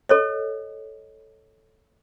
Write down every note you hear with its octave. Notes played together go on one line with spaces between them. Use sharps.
A4 C#5 D#5